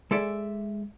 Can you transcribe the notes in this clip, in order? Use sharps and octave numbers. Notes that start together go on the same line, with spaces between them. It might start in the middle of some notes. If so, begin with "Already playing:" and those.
G#3 A4 D5 E5